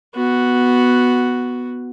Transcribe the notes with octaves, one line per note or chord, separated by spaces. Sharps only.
B3 F#4